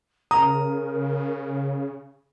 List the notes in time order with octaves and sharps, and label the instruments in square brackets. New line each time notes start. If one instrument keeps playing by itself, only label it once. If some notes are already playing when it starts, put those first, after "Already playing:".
[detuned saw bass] C#3 [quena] A#4 [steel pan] A#5 [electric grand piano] D#6